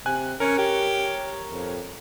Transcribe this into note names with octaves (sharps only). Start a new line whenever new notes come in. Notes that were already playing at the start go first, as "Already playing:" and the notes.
C3 G#5 F#6
C#4 A#4 C#5
G4
F2